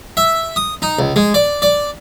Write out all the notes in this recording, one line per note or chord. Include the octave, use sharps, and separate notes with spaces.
E5
D#6
D#4
C#2
G#3
D5
D5